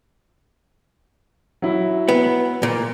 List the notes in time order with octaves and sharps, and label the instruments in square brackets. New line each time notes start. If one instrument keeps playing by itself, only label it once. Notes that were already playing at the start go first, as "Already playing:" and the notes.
[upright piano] F#3 E4
[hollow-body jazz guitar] B3
A#2